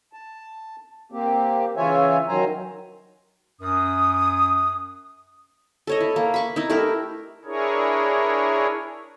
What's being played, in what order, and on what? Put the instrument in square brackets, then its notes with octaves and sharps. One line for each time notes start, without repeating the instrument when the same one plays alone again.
[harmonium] A5
A#3 C4 G4
C#3 E3 F4 C#5 E5 G#5
D#3 F#3 C5 G#5 A#5
[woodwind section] F#2 D#6
[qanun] A4 C#5 D#5
E4
A#3
B5 C#6 D6
D#4 E4
A3 E4 G4 A#4
[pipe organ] D4 E4 G#4 A#4 C#5